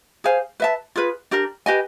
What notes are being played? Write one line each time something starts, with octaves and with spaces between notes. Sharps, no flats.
G#4 C5 F5 G#5
B4 E5 A5
F4 G#4 B4
D4 G4 A#4
G4 B4 D#5 G#5